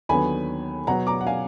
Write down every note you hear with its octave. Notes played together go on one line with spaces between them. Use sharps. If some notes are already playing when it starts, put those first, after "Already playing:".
D#2 D3 F#3 B3 G#5 B5
B2 F#3 B3 F#5 A#5
A#5 D6
F#5
F5 G#5